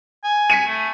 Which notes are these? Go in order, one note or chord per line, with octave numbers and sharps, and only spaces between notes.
G#5
B6 C#7 D#7
A3